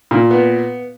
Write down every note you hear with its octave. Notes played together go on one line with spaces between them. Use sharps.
A#2
B3